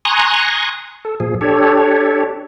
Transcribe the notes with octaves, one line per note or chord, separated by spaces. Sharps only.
G#5 A#5 C6 C#6 D#6 F#6
A4
A#2 F3 G#4
D4 G4 A4 C#5